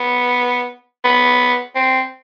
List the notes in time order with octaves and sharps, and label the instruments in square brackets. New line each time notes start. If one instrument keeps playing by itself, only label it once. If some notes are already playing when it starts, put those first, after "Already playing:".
Already playing: [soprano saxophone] B3
B3
C4